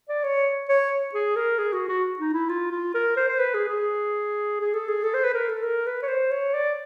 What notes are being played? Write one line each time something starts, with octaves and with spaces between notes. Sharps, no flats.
D5
C#5
C#5
G#4
A#4
G#4
F#4
F#4
D#4
E4
F4
F4
A#4
C5
C5
B4
G#4
G#4
G#4
A4
G#4
A4
C5
B4
A#4
A4
A#4
B4
C#5
C5
C#5
D5